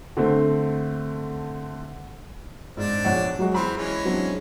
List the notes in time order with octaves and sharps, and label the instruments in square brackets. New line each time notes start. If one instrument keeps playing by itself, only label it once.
[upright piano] D3 A3 C4
[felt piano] G#2 [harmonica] C4 D4
[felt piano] A#1 C#5 F#5
F#3 G#3 F#4
[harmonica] E3 C4 [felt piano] B5 C6
[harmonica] E3 G#3 C#4
[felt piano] F#3 C4 D4